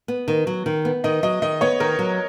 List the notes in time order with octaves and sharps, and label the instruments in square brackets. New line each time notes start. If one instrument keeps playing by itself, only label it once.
[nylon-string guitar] B3
D#3
F#3
D#3
B3
[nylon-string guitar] D#3 [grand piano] D#5
[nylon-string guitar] F#3 [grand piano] D#5
[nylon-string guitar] D#3 [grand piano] D#5
[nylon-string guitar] B3 [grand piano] C#5
[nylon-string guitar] D#3 [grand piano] A#4
[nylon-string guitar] F#3